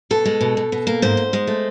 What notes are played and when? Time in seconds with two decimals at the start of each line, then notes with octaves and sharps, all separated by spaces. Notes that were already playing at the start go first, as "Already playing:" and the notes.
0.11 B2 A4
0.25 G#3
0.41 B2
0.57 B2
0.72 B2
0.87 A#3
1.02 G#2 C5
1.17 G#2
1.33 G#3
1.47 A3